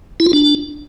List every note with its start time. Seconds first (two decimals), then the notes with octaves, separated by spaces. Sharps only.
0.20 E4
0.26 F4
0.33 D4